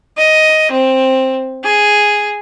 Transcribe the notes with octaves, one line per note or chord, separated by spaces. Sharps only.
D#5
C4
G#4